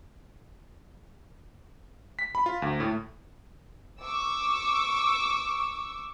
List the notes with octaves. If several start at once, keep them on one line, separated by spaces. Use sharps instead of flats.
B6
B5
F4
D2
A2
C#6 D6 E6